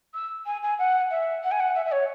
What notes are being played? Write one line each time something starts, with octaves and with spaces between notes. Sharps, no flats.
E6
G#5
G#5
F#5
E5
F#5
G#5
F#5
E5
E5
C#5